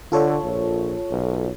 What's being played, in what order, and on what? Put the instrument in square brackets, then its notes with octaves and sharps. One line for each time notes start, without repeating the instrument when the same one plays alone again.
[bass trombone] D3 [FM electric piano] F4 A4 C#5
[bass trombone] A#1
B1